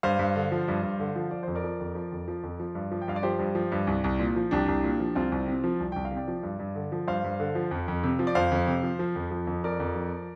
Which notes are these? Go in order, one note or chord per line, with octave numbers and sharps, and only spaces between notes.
G2 C5 F5
G2
D3
F3
G2
G2
D3
F3
F3 D5
F2 C5
A#4 D5
F3
F2
F3
F2
F3
F2
F3
G2
F3
G5
G2 F5
D5
F3 G4 C5
G2
F3
G2
C2
C2
A#2
F3
C2 D4 G4
C2
A#2
F3
C2 C4 F4
C2
C3
F3
C2
C2 G5
F5
C3
D5 G5
F3
G2
G2
D3
F3
G2 C5 F5
G2
D3
F3
F2
F2
C3
F3
D5
F2 C5 F5
F2
C3
F3
F3
F2
F3
F2
F3 A#4 D5
F2
F3